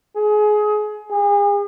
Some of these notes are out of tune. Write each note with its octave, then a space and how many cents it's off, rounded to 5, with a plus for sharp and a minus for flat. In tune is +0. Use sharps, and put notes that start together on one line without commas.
G#4 +25
G#4 -40